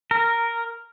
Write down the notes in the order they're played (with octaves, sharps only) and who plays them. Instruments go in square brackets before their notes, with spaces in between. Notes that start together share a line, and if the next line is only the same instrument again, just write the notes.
[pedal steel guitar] A#4